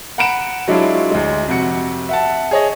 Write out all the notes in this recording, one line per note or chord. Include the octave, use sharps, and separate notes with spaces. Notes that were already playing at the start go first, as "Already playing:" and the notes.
F#5 A#5 B5 C#7 D7 E7
F#3 G#3 D4 E4 F4
D2 G#3
F2 C3 F#4 C#7
E5 F#5 A5
G#4 C#5 D#5